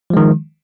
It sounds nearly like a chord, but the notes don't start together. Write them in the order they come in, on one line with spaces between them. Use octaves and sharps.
F3 G#3 D#3